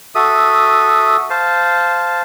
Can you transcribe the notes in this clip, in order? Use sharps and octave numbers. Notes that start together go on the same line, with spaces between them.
F#4 A4 E5 D#6
C5 F5 A5